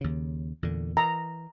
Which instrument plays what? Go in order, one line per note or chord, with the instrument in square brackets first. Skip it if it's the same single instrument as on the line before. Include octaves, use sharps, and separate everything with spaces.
[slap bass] D#2 C#3
E2 A#2 D3
[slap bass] E3 [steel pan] A#5